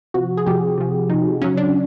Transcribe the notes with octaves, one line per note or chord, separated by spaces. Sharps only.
C3 F3 F#4
G#4
C3 F3 G4
C3 F3
C3 F3 D#4
C#3 F#3 C#4
D4